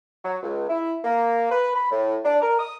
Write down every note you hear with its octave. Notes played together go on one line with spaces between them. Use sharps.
F#3
C#2
E4
A#3
B4
B5
A2
D4
A#4
D#6